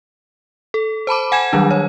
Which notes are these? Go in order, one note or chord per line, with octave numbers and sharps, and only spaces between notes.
A4
C5 A5 B5 D6
F#5 G#5 G#6 E7
D#3 F#3 G3 D4
C#5